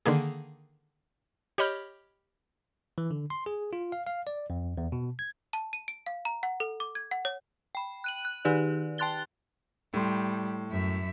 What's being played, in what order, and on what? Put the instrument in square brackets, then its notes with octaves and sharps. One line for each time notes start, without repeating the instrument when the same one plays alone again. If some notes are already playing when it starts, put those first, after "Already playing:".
[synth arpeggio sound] D3 D#3 A#3 G#4
G4 C#5 D#5 B5 F6 G6
[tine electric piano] E3
D3
C6
G#4
F4
F5
F5
D5
F2
E2
B2
G#6
[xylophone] A5
D#7
D7
F5
A#5
F#5
A4
D6
G#6
F#5
C#5
[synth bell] G5 B5
F#6 D#7 F#7
F#6
D#3 D#4 G4 B4 D5
G5 A5 C6 F#6 A6 G7
[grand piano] A2 C6 [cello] G3
[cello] F#2 E5